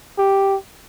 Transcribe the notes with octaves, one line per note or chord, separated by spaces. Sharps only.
G4